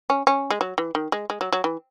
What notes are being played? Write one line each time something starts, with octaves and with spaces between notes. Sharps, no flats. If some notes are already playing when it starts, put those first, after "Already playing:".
C#4
C#4
G#3
F#3
E3
D#3
G#3
G#3
F#3
F#3
E3